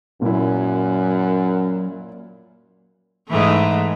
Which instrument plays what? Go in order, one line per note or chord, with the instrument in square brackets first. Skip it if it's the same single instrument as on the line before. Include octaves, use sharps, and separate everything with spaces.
[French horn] F#2 [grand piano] A#2 E4 [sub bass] F#3
[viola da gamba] G#2 E3 A3